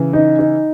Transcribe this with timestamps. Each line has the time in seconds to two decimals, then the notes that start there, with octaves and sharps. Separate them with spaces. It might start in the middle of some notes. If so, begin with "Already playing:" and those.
Already playing: C#3 E3
0.13 D#4
0.39 D#4